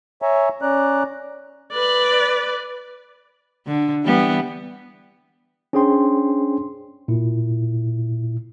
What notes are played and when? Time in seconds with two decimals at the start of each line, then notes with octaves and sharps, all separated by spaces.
0.22 C#5 E5 G#5 A#5
0.62 C#4 D5 A#5 F#6
1.72 B4 D5
3.67 D3
4.04 E3 G3 B3
5.73 C#4 D4 G#4 C5 G5 C6
7.08 A#2 E4